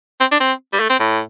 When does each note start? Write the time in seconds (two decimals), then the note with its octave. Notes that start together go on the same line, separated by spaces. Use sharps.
0.20 C4
0.32 D4
0.40 C4
0.73 G3
0.80 A3
0.90 C4
1.00 A2